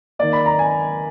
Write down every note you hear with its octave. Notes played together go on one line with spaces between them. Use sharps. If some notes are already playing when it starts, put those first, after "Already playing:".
D#3 A#3 D5
B5
A#5
G#5